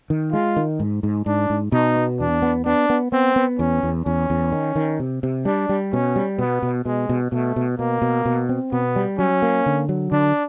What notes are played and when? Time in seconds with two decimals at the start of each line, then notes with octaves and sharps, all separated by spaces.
0.10 D#3
0.32 G#3 F4
0.57 D#3
0.80 G#2
1.03 G#2
1.26 G#2 D4
1.50 G#2
1.72 B2 D#4
1.96 B3
2.20 E2 D4
2.42 B3
2.66 B3 D4
2.90 B3
3.12 B3 C4
3.36 B3
3.59 E2 C#4
3.83 E2
4.06 E2 C#4
4.30 E2
4.52 D#3
4.76 D#3
5.00 C3
5.23 C3
5.45 G3 D4
5.69 G3
5.93 B2 C#4
6.16 G3
6.39 B2 B3
6.62 B2
6.85 B2 G#3
7.09 B2
7.32 B2 A3
7.56 B2
7.79 B2 A#3
8.02 B2
8.26 B2
8.49 C4
8.72 B2 B3
8.96 G3
9.19 F#3 C#4
9.42 A#3
9.66 D3
9.89 F#3
10.12 D3 D4